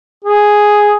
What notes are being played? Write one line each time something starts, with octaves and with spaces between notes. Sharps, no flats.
G#4